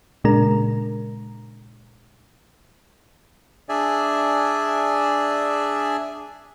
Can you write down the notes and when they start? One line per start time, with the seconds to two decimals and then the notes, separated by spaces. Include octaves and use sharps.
0.24 A#2 C#3 G#3 D4 A#4 A#5
3.69 D4 G#4 D5 E5 G#5